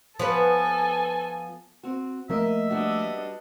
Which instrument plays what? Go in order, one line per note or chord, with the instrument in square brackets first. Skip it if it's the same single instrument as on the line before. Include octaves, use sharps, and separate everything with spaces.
[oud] F3 B3 B4 [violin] A4 G#5
[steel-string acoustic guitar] C4 F#4
[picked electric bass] F3 A3 A#3 [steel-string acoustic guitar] A#4 D#5 [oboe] E5
[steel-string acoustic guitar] G3 B3 F#4 [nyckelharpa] D4 D#5